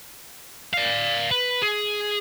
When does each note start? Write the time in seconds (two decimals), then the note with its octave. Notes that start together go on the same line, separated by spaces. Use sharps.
0.74 D5 F5
1.31 B4
1.62 G#4